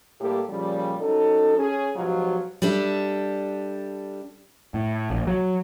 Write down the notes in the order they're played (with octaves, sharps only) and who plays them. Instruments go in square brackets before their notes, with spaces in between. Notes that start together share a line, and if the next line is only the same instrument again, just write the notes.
[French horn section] A2 G3 A#3 G4 A4
A#2 C#3 F3 G3
F#3 C#4 D#4 A4
C#4 G#4
G#2 B2 F3 F#3 F4 G4
[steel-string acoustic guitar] G3 D4 A4 E5
[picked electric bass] A2
A#1
F#3